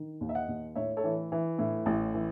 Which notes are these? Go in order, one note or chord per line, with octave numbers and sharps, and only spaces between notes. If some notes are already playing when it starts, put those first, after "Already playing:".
Already playing: D#3
D#2
E5
D#5 F#5
D#2
A2 C#5 E5
A4 C#5
E3
E3
A2
A1
E3